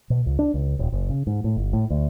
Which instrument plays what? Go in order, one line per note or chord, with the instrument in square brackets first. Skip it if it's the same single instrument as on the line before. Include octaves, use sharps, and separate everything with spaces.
[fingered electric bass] B2
C#2
D4
C#2
D#1
F#1
C#3
G#2
A2
G1
A2
D2